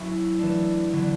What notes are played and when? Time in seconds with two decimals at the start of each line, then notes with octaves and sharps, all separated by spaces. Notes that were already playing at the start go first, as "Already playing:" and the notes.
Already playing: F#3 A3 C#4 E4
0.39 E3 A3 D4
0.93 D3 F#3 B3 D4